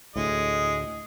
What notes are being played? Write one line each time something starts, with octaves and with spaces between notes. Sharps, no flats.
D2 A2 G#3 D#5